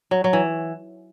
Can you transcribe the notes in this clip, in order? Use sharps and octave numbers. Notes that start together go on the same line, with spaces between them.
F#3
F#3
E3